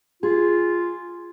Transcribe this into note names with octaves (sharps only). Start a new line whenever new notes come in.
F4 G#4